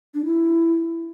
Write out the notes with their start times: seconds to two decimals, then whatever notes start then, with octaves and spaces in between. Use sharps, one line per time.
0.14 D4
0.25 E4